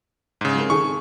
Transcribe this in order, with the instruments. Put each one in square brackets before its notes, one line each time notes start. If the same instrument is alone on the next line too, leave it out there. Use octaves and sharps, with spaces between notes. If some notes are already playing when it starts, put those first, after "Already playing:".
[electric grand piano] G#2 C#3
[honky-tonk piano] G#3 C4 A#4
[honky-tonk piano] D#3 G#4 A4 [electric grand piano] C#6